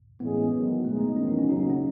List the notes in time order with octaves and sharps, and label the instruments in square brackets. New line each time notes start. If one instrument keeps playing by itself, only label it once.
[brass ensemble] A2 E3 G#3 C#4 G#4 [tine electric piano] B3
[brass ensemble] E2 D#3 F#3
[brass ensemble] B2 G#3 D#4 [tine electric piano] A3
[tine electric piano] B3
[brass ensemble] E2 D#3 F#3 [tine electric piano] C#4
[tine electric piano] D#4
C#4
[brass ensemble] D#2 C#3 F#3 [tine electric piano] D#4
[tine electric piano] D#4
C#4